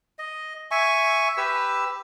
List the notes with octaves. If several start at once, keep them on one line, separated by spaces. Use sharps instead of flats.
D#5
E5 G#5 C#6
G4 B4 E6